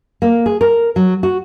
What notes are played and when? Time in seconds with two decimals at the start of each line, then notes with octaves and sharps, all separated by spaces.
0.22 A#3
0.46 G#4
0.61 A#4
0.96 F#3
1.23 F#4